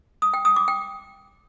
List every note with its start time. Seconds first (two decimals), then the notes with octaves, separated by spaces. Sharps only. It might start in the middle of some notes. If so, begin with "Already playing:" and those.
0.22 D#6
0.34 G5
0.45 D#6
0.56 D6
0.68 G5